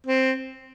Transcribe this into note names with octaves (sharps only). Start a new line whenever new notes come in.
C4